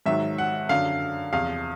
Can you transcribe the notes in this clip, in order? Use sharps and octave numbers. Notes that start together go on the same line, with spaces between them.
G#2 D#3 F#3 E5
F#5
F#2 D3 F#3 F5
E2 C3 F3 F5